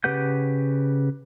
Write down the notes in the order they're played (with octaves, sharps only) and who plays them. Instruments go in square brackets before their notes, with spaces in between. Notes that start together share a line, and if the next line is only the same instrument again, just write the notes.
[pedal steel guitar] C#3 G4 B4 F#5 G6